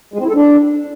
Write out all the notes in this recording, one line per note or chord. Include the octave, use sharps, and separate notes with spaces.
G#3
C4
E4
A4
D4